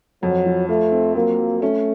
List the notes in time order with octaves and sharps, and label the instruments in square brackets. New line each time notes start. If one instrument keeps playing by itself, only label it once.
[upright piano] F2 [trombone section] F#3
[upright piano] F3
[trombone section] A3 [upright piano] F4
[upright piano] C4
[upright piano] F#3 [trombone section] A#3
[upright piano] F#3
[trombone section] A3 [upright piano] C#4